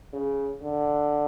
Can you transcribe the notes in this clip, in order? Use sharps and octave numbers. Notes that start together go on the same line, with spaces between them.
C#3
D3